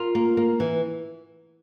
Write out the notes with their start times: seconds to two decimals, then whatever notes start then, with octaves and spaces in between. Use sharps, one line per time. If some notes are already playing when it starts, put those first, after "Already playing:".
Already playing: F4 A#4
0.15 A#3
0.37 A#3
0.60 E3